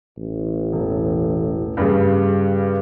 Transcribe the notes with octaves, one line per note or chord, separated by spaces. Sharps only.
A1
E1
G2 C#3 G3